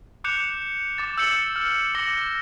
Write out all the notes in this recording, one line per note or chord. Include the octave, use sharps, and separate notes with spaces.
D6 F#6 G6 C#7 E7 F7
D6 A6 E7
E6 G6 A6 C#7 F#7 G7
F6
D6 A#6 C#7 F#7 G7